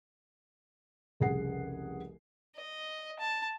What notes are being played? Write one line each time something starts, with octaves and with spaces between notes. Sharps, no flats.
F1 C2 C#3 G#4 F#5 C7
D#5
A5